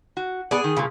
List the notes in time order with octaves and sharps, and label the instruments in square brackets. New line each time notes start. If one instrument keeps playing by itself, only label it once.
[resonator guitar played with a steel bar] F#4
[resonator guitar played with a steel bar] B3 D5 [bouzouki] G#4
[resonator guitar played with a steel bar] D#3
[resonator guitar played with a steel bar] G2 A#2 [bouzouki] C#3